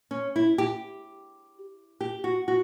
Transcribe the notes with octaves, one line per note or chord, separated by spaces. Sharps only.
C#4
E4
G4
G4
F#4
F#4